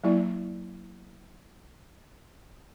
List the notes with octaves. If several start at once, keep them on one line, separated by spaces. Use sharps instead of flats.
F#3 A#3 E4 D5